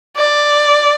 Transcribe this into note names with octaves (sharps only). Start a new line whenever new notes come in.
D5